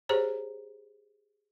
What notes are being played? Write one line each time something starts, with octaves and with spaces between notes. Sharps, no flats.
G4 G#4 C5 C#5 A#5